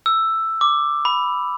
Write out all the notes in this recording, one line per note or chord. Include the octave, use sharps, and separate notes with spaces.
E6
D6
B5